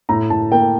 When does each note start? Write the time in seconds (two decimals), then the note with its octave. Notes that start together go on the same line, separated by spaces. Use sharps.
0.09 A2 A#5
0.30 A2 A5
0.52 A#3 G5